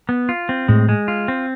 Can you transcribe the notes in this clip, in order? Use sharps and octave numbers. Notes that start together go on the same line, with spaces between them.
B3
F4
C4
A2 G#3
G#3
F4
C4